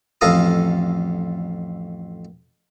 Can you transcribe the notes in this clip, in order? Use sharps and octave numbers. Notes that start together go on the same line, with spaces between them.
A1 F2 A4 F5 A#5 D#6